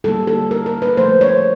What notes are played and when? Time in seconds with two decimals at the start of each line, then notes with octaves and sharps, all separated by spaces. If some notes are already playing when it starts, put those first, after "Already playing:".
0.04 D3 G3 A#3 A4
0.27 A4
0.51 A#4
0.66 A#4
0.82 B4
0.97 A#2 F3 A3 C5
1.21 C#5